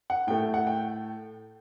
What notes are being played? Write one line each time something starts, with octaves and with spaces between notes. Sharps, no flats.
F#5
A2 A3 G5
F#5
G5